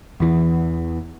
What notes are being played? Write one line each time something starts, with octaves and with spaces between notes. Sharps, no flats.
E2 E3